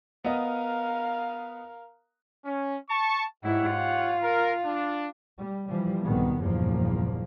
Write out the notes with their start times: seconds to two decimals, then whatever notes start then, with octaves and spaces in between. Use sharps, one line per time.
0.24 B3 A#4 D#5 F5
2.45 C#4
2.89 A5 C#6
3.44 G#2 E4 G4 C#5 F#5
3.72 F4
4.23 A#4
4.65 D4
5.38 G3
5.68 E3 F3 G3
6.03 C2 G#2 B2 D3 D#3 B3
6.40 F#1 E2 G2 A#2 F3 A#3